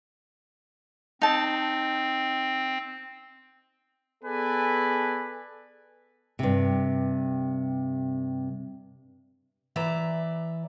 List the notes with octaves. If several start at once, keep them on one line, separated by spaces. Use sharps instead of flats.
C4 D#4 A5
B3 G#4 A4 B4 D5 G#5
G2 C3
E3 D5 E5 A#5